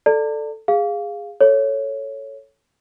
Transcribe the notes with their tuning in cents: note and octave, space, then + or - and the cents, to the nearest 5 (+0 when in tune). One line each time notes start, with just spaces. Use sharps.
A4 +0 D5 +10 A#5 -45
G#4 -15 F5 +0
A4 +0 C#5 +0